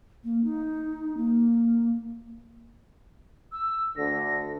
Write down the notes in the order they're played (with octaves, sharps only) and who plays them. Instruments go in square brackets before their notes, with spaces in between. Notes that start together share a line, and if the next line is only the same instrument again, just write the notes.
[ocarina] A#3
D#4
A#3
[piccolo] E6
[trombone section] D2 D3 [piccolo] A#6